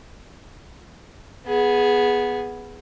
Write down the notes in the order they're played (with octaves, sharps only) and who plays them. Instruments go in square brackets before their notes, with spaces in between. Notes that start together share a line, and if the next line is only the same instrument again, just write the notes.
[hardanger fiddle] B3 G#4